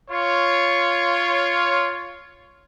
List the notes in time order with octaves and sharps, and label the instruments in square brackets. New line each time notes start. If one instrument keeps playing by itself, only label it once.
[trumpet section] F4 C#5